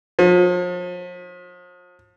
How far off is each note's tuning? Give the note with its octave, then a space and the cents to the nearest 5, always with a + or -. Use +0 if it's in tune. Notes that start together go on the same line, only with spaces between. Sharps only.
F3 +40